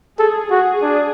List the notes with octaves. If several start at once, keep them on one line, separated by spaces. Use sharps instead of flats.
G#4 A4
F#4 G#4
D4